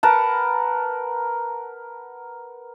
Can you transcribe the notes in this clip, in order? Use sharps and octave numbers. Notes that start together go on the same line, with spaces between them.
A#4 B4 F#5 A5